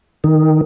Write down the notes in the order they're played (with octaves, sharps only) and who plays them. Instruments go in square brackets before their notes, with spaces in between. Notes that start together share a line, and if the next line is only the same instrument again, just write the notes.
[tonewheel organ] D#3